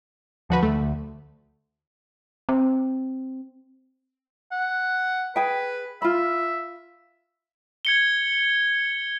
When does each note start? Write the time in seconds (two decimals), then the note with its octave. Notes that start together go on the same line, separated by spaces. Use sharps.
0.50 D2 F3 F#4 B4
0.63 D2 A3
2.49 C4
4.52 F#5
5.36 G#4 B4 G5
6.02 F4 E5 B5
7.85 G#6 C#7 G7